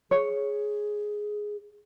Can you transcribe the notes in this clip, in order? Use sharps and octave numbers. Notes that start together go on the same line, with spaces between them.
G#4 C#5